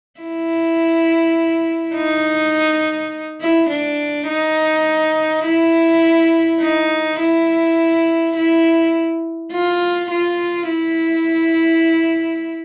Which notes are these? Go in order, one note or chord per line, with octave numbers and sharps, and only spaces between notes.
E4
D#4
E4
D4
D#4
E4
D#4
E4
E4
F4
F4
E4